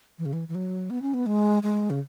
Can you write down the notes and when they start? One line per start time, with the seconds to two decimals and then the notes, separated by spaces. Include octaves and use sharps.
0.19 E3
0.26 C#3
0.33 E3
0.48 E3
0.55 F#3
0.90 B3
1.02 C#4
1.14 B3
1.26 G#3
1.63 G#3
1.90 C#3